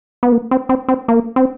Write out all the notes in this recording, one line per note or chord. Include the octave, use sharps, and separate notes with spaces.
B3
A#3
C4
C4
C4
A#3
C4